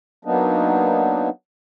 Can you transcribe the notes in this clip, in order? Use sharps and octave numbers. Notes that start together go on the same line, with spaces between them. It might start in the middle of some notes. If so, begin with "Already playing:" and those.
F#3 A#3 B3 D4 D#4